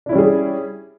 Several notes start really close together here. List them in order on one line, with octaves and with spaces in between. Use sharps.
D4 E4 C#4 G3 G#4